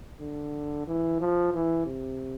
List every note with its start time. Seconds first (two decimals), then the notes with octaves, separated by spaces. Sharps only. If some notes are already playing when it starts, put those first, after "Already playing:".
0.21 D3
0.88 E3
1.20 F3
1.54 E3
1.86 C3